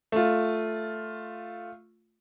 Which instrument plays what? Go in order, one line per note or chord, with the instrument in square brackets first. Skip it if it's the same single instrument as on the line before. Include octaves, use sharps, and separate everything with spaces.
[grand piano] A3 F4